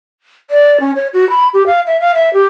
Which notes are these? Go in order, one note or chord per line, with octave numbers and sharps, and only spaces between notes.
D5
C#4
C#5
F#4
B5
G4
F5
E5
F5
E5
G4